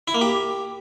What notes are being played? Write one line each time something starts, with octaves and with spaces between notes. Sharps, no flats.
E4
A#3
G4